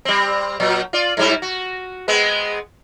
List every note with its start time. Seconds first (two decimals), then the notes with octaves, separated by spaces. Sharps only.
0.05 G3 C4
0.60 A#2 F#3
0.93 F4 D5
1.17 G#2 G3 E4
1.42 F#4
2.08 G#3 B3 C4